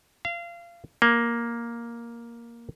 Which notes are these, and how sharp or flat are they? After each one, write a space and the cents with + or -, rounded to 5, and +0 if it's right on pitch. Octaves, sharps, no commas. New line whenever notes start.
F5 -25
A#3 +5